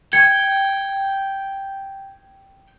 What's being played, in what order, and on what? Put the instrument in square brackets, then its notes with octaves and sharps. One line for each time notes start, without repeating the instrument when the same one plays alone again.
[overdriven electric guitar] G5 [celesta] G#6 C#7